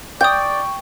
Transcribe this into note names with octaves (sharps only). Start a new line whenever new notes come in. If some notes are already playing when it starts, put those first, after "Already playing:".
D5 G5 C#6 D#6 G6